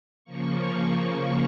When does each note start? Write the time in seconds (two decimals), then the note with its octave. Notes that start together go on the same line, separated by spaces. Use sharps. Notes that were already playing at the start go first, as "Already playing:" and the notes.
0.24 C#3 F3 A#3 C#6